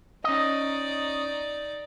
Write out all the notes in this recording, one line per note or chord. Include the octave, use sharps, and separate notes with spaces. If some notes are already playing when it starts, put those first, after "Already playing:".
C#4 D#4 D5 D#5